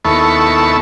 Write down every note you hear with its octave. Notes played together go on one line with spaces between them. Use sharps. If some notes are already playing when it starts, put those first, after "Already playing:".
D#2 B3 E4 A4 C#6